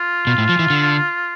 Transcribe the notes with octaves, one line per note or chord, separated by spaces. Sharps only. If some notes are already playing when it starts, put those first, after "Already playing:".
Already playing: F4
B2
A2
F3
E3
D3